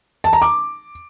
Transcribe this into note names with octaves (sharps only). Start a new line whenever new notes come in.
A5
A#5
D6